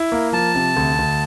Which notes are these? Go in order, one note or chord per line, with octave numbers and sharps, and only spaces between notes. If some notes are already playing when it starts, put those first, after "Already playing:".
Already playing: E4
A#3
F3 A5
C3
D2
D2